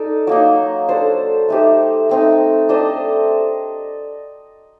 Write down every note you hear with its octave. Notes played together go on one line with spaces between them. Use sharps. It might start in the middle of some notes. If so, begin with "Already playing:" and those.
Already playing: D#4 A4 D5
F#3 A#3 D#4
D4 A4 C5
A3 D#4 G4 C5
A3 C4 D#4
D4 A4 C5 D#5